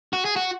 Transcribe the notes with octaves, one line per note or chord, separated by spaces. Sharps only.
F#4
G#4
F#4